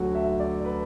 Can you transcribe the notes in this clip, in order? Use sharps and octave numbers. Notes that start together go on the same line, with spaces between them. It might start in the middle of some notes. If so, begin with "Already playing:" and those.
Already playing: D2 D3 F#3 F#4 A4
E5
D5
B4